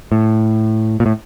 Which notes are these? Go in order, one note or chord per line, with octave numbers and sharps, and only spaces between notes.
A2
A#2
A2